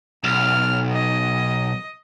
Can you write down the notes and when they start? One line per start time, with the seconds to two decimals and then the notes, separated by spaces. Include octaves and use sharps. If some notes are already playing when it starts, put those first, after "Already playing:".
0.24 B1 F6
0.92 D#5